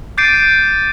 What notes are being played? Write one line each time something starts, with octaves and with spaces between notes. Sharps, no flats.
D6 G6 A6 C7 D7 D#7